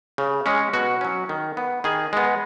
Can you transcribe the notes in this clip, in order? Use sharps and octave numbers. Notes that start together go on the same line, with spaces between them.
C#3
G#3 C#4
B2 F#4
F#3 C#4
D#3
B3
D#3 G#4
G#3 B3